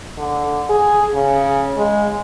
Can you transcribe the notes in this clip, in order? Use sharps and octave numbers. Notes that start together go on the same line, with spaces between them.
D3
G#4
C#3
G#3